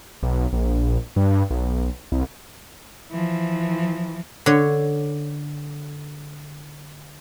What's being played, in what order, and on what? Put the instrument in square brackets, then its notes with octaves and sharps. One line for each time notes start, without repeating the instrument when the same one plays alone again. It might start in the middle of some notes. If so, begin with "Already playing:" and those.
[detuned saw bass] B1
A#1
G2
B1
C2
[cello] E3 F3
[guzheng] D3 C#5